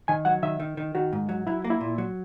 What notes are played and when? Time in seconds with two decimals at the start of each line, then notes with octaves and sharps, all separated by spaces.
0.08 D#3 G#5
0.25 F#3 F#5
0.43 D#3 E5
0.60 D#3
0.77 D#3
0.95 D#3 F#4
1.13 G#2
1.29 F#3
1.47 F#3 E4
1.64 A#3
1.70 E4
1.81 A#2
1.98 F#3